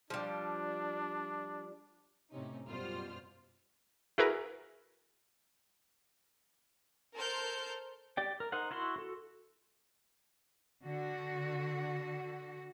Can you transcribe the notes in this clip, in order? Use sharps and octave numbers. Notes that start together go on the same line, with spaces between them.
F3 G3 D4
A2 C3 C#4 D#4
F#2 B2 G3 F4 C5 F6
E4 F#4 G#4 A#4 B4 A#5
A4 A#4 C5 C6 F6 G6
G4 D5 G5
A#4
D#4 A#4 C5 F#5
E4 F#4 B5 C6
F#4 A4
D3 F#4